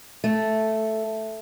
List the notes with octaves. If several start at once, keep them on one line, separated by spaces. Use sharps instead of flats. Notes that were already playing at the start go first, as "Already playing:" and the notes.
A3